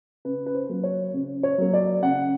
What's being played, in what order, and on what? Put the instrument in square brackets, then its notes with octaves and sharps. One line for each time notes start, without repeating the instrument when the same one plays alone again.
[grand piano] C#3 B4
B4
C5
F#3 A#3
C#5
C#3
C#5
F#3 A#3
D5
C#3 F#5